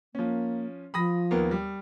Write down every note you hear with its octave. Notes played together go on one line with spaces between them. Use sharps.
F3 A#3 C#4
F3 B5 D#6 A#6
D#2 A#3 B3
G3